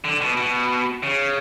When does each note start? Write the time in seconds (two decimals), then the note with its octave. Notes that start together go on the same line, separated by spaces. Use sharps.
0.05 D3
0.21 B2
0.37 B2
1.03 C#3